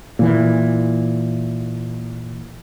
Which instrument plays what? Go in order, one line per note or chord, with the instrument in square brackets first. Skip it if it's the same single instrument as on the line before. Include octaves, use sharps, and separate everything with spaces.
[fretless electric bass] A#2 E3